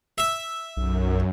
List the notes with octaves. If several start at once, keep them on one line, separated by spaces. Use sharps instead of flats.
E5
B1 F#2